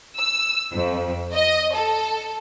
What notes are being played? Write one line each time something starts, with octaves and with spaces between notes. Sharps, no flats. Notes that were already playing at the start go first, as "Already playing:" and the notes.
E6
F2
D#5
A4